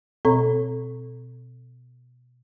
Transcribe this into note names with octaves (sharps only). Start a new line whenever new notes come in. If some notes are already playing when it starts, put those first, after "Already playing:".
B2 C4 A4 C#5 A#5 C#6